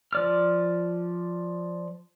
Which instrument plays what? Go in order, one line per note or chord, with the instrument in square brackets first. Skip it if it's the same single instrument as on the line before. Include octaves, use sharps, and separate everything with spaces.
[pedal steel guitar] F3 D5 F6